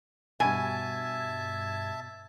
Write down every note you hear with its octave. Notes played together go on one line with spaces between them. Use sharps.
G2 B2 E5 G#5 A5 G#6